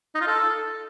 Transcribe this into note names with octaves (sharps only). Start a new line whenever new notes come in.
D#4
F4
A4